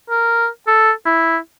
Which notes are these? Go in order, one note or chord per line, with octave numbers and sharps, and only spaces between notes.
A#4
A4
E4